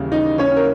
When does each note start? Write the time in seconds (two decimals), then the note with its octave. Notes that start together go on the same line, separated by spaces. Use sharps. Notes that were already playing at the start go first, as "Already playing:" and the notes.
Already playing: D#2 C#3 E3 G3
0.12 D#4 D#5
0.38 C#4 C#5
0.56 A#4